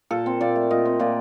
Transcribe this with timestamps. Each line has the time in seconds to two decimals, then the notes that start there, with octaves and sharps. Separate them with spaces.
0.11 A#2 A4
0.26 C4
0.41 A#2 D5
0.56 A3
0.71 A#2 D#5
0.85 C4
0.99 A#2 D5